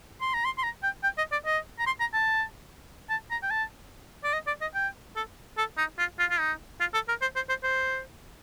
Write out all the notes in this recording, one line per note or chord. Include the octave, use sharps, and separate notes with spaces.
C6
A#5
C6
C6
A#5
G5
G5
D#5
D5
D#5
A#5
C6
A#5
A5
A5
A#5
G5
A5
D5
D#5
D5
D#5
G5
A4
A4
D#4
F4
F4
F4
D#4
F4
A4
A#4
C5
C5
C5
C5